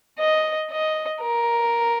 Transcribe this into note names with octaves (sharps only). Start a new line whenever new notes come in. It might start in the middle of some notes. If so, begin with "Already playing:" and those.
D#5
D#5
A#4